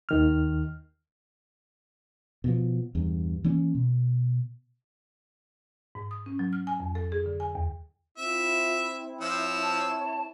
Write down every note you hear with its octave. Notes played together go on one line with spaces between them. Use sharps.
D#2 D#3 F6
B2 F3
E2 G2
E3 A#3 C#4
B2
G#2
D#6
C#4
F#3
F6
G#5
F2
A4
G#4
D3
G#5
E2
C4 E4 F4 E5
F3 C#5 E6
A5